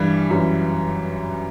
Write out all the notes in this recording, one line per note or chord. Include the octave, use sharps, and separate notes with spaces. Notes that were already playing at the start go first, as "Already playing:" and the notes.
Already playing: G2 E3 G3
F#2 E3